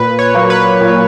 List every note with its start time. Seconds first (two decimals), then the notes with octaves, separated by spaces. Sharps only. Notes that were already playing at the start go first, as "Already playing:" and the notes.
Already playing: A#2 B4
0.19 C#5
0.35 F#3 A#3
0.50 B4
0.81 A#2